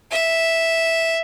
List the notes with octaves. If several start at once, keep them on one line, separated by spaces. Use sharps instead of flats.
E5